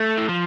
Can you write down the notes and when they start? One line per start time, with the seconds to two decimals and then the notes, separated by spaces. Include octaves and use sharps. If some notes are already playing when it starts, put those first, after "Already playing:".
Already playing: A3
0.18 E3
0.29 F3